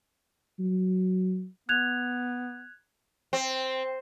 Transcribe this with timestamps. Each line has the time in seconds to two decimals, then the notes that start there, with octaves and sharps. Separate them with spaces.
0.60 F#3
1.69 B3 F#6 G#6 F7
3.33 C4